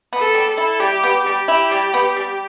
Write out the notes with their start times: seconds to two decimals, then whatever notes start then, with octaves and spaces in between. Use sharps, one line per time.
0.13 B3
0.19 A4
0.34 G3
0.50 A4
0.58 E4
0.80 G3 G4
1.03 B3
1.26 G3 G4
1.48 E4
1.71 G3
1.94 B3
2.16 G3